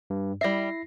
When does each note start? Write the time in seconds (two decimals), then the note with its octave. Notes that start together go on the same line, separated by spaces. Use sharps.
0.10 G2
0.41 G3 E4 E5 A#6 C7